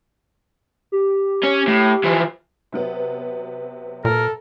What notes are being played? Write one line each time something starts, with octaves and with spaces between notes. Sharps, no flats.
G4
C#4
A2
E3 F3
C3 F#3 B3
A#2 A4 A#4